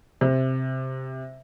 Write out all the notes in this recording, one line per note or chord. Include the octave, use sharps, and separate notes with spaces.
C3